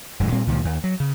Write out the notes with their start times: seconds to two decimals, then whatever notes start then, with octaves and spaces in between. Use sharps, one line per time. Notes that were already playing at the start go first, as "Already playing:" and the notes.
0.20 D#1 F#2 A2 G#3
0.32 A#2 G3 A#3 C4
0.47 C#2 A#2 D#3 F3
0.65 D#2
0.84 F#3
1.00 C#3